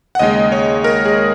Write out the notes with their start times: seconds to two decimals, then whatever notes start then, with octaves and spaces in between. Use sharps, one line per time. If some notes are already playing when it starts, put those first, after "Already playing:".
0.15 F#5
0.19 D#2 C#3 G#3 D#5
0.52 C#5
0.84 A#4
1.05 G#4